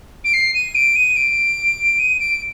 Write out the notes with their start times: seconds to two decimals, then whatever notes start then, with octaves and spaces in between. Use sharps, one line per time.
0.24 D7
0.33 C7
0.54 D#7
0.75 D7
0.95 D#7
1.16 D7
1.99 D#7
2.19 D7